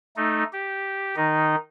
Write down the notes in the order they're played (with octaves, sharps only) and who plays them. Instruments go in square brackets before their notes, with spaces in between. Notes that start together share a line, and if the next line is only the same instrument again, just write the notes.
[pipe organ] A3 D#4
G4
D#3 D#4